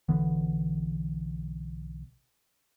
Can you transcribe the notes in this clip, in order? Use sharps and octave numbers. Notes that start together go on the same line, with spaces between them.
B1 D3 E3 B3